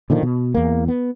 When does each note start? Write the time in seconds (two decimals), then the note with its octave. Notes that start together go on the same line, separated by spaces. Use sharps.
0.10 A#2 D3 D#3 F3
0.23 B2
0.54 E2 A#3
0.88 B3